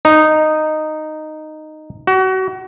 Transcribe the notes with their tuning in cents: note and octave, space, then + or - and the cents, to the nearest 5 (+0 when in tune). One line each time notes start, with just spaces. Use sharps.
D#4 -10
F#4 +30